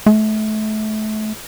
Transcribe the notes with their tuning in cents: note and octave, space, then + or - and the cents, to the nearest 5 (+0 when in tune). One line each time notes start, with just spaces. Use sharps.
A3 -30